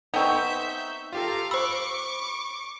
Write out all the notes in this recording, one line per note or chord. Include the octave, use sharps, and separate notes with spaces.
B3 C4 D#4 E5 C#6 G6
F4 G4 A4 F5 A#5
C5 B5 C#6 D6 E6